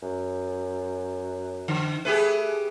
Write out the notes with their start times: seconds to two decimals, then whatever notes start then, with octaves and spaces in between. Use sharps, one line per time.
0.02 F#2
1.68 D3
2.05 A3 G4 G#4 B4